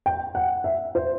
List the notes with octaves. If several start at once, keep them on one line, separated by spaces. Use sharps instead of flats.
G5
F#5
E5
C5